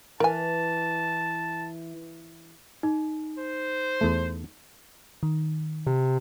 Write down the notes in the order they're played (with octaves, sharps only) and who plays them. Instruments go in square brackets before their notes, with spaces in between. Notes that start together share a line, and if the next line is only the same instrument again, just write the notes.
[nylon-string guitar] E3 [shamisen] A#4 G#5 [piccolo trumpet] A5
[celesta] D#4
[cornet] C5
[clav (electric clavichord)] E2 A3
[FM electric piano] D#3
[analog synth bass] C3